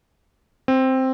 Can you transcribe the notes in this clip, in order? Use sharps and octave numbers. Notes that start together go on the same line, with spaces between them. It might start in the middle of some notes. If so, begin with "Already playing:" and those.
C4